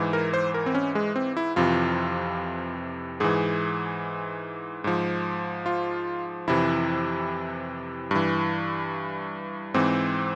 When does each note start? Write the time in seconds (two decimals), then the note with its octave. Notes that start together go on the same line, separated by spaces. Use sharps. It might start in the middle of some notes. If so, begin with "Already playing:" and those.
Already playing: G#2 E3
0.13 A#4
0.34 C5
0.54 A#4
0.66 C4
0.75 C#4
0.95 G#3
1.16 C4
1.37 E4
1.56 F2 C3 E3 F4
3.20 G#2 E3 G#4
4.84 G#2 F3
5.66 F4
6.47 F2 C3 E3 E4
8.11 G2 E3
9.74 G#2 E3 C4